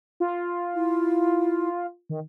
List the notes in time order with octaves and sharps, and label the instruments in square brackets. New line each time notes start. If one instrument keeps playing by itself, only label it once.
[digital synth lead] F4
[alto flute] E4
[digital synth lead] D#3